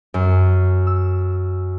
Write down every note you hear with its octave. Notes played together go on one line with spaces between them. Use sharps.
F#2
E6